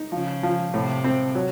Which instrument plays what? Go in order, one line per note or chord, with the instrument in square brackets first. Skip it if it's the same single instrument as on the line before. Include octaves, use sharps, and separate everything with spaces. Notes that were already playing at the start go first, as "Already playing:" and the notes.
Already playing: [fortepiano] D#4
[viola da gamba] C#3 [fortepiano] F3
[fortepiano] F3
[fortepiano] A2 [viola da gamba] C3
[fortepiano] C4
F#3